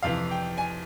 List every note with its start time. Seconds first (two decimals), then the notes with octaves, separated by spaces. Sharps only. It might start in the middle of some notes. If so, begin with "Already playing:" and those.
0.03 F2 C3 E3 F5
0.31 G5
0.58 G#5